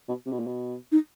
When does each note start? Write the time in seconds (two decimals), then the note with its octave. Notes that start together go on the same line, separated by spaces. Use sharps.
0.08 B2
0.26 C3
0.32 B2
0.39 A#2
0.47 B2
0.92 D#4